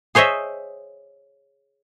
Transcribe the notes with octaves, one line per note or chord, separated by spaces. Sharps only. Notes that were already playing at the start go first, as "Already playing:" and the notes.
G#4 C5 C#5 D#5 E5